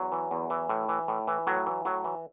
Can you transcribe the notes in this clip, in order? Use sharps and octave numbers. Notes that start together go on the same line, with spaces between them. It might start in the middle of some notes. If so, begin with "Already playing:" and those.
Already playing: E2 F#3
E3
E2
E3
A2
E3
A2
E3
A2 F#3
E3
A2 F#3
E3